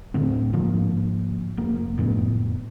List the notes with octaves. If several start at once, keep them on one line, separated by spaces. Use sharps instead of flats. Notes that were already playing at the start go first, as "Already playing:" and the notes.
D1 A2 D3 C4
G#2 D3 F3 A#3
F1 A#3
F#1 F2 A2 B3